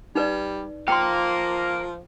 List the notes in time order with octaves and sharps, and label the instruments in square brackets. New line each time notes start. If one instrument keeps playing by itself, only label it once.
[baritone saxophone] G3 [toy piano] D#4 B4 D5
[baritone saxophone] F3 [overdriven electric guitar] A#4 F5 [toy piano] G5 C6